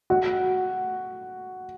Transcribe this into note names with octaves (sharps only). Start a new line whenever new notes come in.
F#4